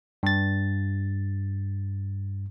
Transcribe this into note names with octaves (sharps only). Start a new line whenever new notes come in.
G2 A6